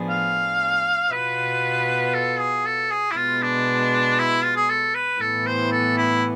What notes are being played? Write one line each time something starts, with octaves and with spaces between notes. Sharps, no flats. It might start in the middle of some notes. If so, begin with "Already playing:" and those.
Already playing: A2 F3 B3 D4 G#4
F5
B2 B3 F4 B4
A4
G#4
A4
G#4
E4
B2 G#3 B3 F4
D4
E4
F4
G#4
A4
B4
A2 E3 B3 A4
C5
A4
E4